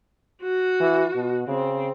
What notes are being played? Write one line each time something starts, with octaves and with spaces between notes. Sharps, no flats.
F#4
E3
B2
C#3 C4